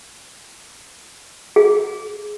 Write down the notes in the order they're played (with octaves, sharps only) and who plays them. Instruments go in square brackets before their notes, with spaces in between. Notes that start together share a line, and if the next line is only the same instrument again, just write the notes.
[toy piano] G#4